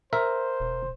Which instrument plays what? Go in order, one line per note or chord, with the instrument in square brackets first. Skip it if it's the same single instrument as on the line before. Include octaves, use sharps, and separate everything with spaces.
[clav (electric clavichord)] A#4 E5 [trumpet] C5
[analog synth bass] E1